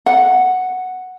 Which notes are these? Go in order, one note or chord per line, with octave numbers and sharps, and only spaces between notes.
F#5